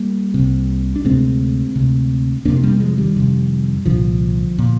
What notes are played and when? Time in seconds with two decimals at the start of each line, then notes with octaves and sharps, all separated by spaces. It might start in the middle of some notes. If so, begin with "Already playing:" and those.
Already playing: G3 A#3
0.34 C3
0.39 C2
0.96 D4
1.05 D2 C3 G#3 C4
1.76 D2 C3
2.45 F2 C3 A#3 D4
2.64 G3 A#3
2.74 A#3
2.80 F3 G#3
2.98 D#3 G3
3.16 F2 C3
3.86 C2 A#2 D3 F3
4.58 A#2